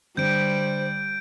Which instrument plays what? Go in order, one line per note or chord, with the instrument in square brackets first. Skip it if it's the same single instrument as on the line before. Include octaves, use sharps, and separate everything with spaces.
[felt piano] D3 [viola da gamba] G3 [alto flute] C5 [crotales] G6 D7